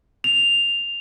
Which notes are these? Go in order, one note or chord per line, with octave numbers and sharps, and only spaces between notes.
F7